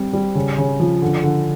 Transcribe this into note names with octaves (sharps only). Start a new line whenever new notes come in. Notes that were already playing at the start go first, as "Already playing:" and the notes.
Already playing: G3 C4
G3
C#3
C#3
F3
D3
D3